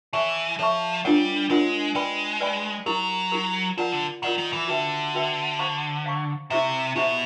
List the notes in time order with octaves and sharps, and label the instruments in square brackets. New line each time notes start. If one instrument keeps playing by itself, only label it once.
[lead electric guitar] E3 [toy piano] A4 C#5 E5 A5 C#6
[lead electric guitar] F3 [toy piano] A4 C#5 E5 A5 C#6
[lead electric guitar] G3 [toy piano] D4 F4 A#4 C#5 F#5
[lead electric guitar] G#3 [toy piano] D4 F4 A#4 C#5 F#5
[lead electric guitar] G#3 [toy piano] B4 D5 G5 B5
[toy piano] B4 D5 G5 B5
[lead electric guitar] F#3 [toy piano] E4 G4 A#4
[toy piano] E4 G4 A#4
[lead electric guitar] F3 [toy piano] F4 A#4 D5 F#5 A#5
[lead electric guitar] D3
[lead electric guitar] D#3 [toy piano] F4 A#4 D5 F#5 A#5
[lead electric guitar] D#3
E3
[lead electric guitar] D3 [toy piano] F#4 B4 E5 G5
[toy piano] F#4 B4 E5 G5
C5 F5 A#5 C#6
C5 F5 A#5 C#6
[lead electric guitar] C3 [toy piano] E4 G4 C5 E5
[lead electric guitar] B2 [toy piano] E4 G4 C5 E5